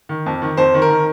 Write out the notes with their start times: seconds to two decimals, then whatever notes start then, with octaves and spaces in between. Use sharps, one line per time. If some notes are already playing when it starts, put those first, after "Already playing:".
0.09 D#3
0.26 F2
0.42 D#3
0.57 F2 C5
0.74 D#3
0.82 A#4
0.90 D#3